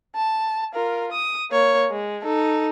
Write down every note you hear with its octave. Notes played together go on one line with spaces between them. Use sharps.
A5
F4 A#4
D#6
A#3 C#5
G#3
D#4 A4